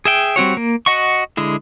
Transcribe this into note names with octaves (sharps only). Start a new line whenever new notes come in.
G#4 E5 G5
G3 C4 F#4 C#5
A#3
F#4 D#5 F#5 C#6
D3 G#3 E4